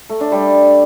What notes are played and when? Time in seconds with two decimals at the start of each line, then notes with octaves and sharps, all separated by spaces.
0.10 A3
0.21 D4
0.32 G3